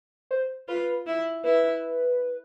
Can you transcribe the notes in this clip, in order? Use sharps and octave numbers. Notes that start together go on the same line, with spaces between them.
C5
F4 B4
E4
E4 B4